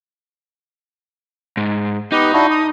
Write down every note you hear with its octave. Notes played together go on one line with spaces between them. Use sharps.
G#2
B3 D#4 G4 B4
D4 E4 F#4
D#6